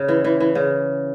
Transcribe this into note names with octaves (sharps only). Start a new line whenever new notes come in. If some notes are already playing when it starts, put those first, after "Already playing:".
Already playing: C#3
E3
E3
E3
C#3